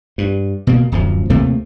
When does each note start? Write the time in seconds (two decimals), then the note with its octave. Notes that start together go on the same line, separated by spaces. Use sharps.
0.18 G2
0.67 B2 A#3
0.92 D1 F#2 F3
1.30 D#2 C3 A3 A#3